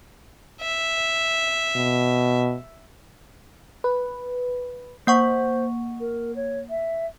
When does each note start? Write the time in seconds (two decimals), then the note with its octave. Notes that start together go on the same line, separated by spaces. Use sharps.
0.61 E5
1.76 B2
3.84 B4
5.07 A#3 C5 F#5 C#6
6.00 A#4
6.36 C#5
6.70 E5